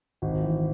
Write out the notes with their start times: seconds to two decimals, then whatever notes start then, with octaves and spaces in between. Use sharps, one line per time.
0.22 G#1
0.44 E3